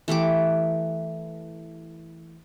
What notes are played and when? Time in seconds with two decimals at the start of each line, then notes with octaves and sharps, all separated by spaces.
0.08 E3 A3 G4 D6